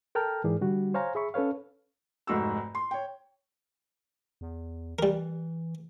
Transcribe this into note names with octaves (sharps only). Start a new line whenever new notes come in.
A4 A#4 G5 A5 A#5 F6
G#2 E3 G#4 D5
D3 G3 F#4
C5 C#5 F5 G#5 A#5
G#4 E5 B5 C#6
C#4 A4 B4 C#5 F5
F1 G#2 F#4 E6
C6
C#5 G5
E2
E3 G3 A#4